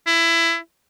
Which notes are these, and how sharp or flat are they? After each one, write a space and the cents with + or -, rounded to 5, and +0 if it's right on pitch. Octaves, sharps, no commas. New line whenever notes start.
E4 +20